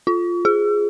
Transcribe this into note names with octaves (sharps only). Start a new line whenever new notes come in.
F4
G#4